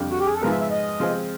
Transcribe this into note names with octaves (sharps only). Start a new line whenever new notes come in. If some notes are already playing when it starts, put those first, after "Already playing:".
Already playing: F2 D3 G3
F#4
G4
G#4
A4
G#2 F3 G#3 B3 A#4
E5
E5
D#5
F3 G#3 C4